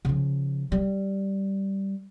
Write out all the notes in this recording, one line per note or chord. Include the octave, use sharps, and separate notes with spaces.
C#3 F3
G3